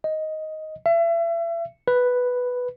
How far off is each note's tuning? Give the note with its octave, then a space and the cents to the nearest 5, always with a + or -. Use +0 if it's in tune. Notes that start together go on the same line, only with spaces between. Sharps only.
D#5 +5
E5 +35
B4 +0